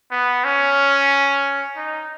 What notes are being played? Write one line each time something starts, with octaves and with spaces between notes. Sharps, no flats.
B3
C#4
D#4